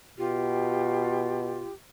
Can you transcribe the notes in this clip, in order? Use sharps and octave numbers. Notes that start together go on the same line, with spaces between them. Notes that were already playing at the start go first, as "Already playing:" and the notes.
B2 F4 G4